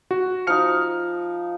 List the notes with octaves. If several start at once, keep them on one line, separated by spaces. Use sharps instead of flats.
F#4
F3 D#4 F6 C#7